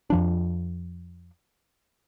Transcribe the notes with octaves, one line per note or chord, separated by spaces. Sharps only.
F2 F3 D4